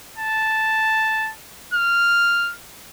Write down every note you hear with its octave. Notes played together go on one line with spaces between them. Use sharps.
A5
F6